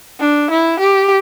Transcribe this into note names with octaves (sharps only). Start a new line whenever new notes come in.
D4
E4
G4